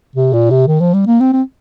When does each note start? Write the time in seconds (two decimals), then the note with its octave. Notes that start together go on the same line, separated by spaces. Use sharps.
0.15 C3
0.33 A#2
0.50 C3
0.67 D#3
0.80 F3
0.94 G3
1.07 A#3
1.21 C4
1.33 C4